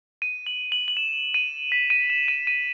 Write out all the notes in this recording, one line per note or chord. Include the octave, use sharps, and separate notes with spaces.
D#7
F#7
F#7
F#7
E7
D#7
B6
D#7
E7
D#7
D#7